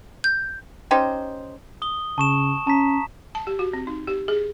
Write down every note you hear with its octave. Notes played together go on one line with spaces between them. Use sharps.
G6
C#4 D#4 G4 C5
D#6 G7
C#3 A5 C#6 E7
C#4 A5 A#5 B6
A5
G4
F#4
C4
D#4
G4
G#4